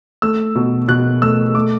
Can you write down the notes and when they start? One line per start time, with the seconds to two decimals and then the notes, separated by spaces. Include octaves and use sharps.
0.22 A3 E6
0.55 B2
0.88 B2 F#6
1.22 A3 E6
1.55 A3 D6